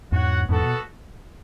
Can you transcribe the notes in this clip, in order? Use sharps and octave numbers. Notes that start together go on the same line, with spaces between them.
E2 G#2 F#4 C#5 F#5
E2 G#2 B3 F#4 A4
B2